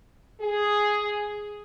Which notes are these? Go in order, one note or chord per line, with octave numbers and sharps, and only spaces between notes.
G#4